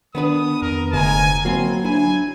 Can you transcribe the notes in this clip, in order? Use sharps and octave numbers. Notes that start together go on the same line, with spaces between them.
D#3 B3 D4 B4 D#6
F2 A#4
F1 D2 G#2 D3 G#3 G#5 A#5
F#3 A#3 C4 E4 F#4
D4 E4 G#5